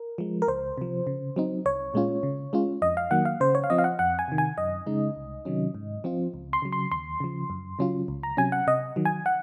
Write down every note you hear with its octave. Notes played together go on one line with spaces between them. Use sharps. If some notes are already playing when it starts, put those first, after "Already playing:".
Already playing: A#4
F3 G#3
A#4
C#2 C5
C3 F3
C#3
F#3 C4 D#4
C2 C#5
A#2 G#3 C#4 F4
C#3
G#3 C#4 F4
F2 D#5
F5
D#3 F#3 A#3 F#5
F5
C#3 C5
C#5
F5
F3 C4 D#5
F5
F#5
F2 F#5
G#5
C3 D#3
G#5
F#2 D#5
C#3 G#3 D#4
C2
C3 D#3 F#3 C#4
G#2
F3 C4 F4
C#2
C6
C#3 F#3
C6
D#2 C6
C#3 F3
F#2
C#3 F#3 C#4 F4
C#2
A#5
C3 F#3 C#4 G#5
F#5
C3 D#5
D#3 F#3
G#5
F#5